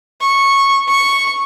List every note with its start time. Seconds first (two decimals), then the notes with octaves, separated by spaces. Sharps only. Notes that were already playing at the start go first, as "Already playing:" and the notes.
0.21 C#6
0.88 C#6